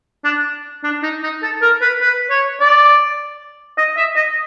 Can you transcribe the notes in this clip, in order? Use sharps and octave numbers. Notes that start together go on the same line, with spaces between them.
D4
D4
D#4
D#4
A4
A#4
B4
B4
C#5
D5
D#5
E5
D#5